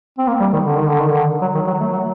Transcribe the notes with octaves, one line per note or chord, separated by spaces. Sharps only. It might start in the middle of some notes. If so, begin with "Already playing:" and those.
C4
A#3
G3
D#3
D3
D#3
D3
D#3
D3
F#3
D#3
F#3
A3
F#3